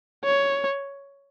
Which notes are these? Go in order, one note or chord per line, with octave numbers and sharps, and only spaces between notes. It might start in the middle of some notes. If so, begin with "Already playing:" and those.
C#5